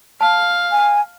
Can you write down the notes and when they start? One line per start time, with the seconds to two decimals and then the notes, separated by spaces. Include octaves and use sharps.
0.21 F5 A5
0.72 G#5